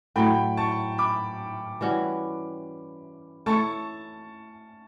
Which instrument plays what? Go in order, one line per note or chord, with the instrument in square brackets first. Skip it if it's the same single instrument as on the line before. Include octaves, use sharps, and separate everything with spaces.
[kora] A2 F#3 A3 [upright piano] G5 B5
[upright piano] A5 C#6
B5 D6
[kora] E3 G3 C#4 F#4
[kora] A3 E4 A4 C#5 [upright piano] A5 C#6